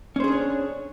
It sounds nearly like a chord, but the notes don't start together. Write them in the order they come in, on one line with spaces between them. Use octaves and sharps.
C#4 C5 G#4 D4 C#5